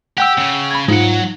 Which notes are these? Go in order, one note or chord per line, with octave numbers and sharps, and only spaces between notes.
G4 F#5 G5 E6
C#3
B5 G#6
G#2 F#3 D#4 F4 F#5